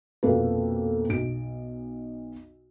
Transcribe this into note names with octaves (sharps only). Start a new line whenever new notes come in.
A#1 F2 B2 A#3 A4 B4
B1 D7